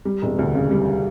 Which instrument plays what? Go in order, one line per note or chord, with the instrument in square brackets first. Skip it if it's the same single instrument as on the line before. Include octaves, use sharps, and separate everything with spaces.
[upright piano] G3
E1
D2
C#3
G3